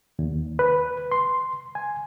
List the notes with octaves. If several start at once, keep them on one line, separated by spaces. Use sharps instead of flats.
D#2
B4
C6
G#5